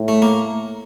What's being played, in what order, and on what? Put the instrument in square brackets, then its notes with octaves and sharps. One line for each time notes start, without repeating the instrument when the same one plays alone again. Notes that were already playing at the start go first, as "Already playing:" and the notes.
Already playing: [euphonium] A2
[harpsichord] A3
A#3